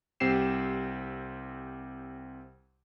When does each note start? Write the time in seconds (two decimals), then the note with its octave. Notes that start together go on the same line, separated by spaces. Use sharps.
0.20 C2 C4 G4 C7 E7